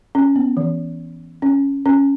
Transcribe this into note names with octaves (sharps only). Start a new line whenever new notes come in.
C#4
B3
E3
C#4
C#4